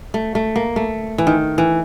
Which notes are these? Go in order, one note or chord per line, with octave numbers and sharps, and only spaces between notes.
A3
A3
A#3
A3
E3
D#3
E3